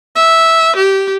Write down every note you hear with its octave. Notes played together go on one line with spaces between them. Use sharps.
E5
G4